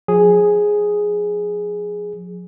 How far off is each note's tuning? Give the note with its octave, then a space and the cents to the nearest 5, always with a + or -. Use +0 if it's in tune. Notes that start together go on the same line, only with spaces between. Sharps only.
F3 +45 G#4 +0